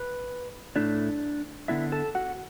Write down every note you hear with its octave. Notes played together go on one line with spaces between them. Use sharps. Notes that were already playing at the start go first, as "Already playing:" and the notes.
Already playing: B4
A2 A3 D4 E4 D5
D3 B3 D4 E4 E5
A4 A5
F#4 F#5